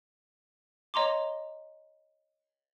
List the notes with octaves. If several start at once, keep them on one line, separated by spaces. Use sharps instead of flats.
C#5 D#5 A#5 C6 D6